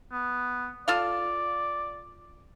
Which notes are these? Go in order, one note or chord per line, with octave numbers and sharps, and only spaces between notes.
B3
F4 A4 D5 F5